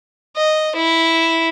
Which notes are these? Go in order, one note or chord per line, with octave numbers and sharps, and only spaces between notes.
D#5
E4